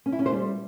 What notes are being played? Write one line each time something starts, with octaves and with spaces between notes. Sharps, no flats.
C#4
E4
C#4
C5
G3